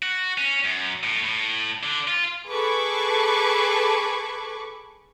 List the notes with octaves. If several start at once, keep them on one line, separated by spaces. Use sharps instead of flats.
F#4
C#4
F#2
A2
A2
D3
F4
G#4 A4 B4 B5 C#6 D6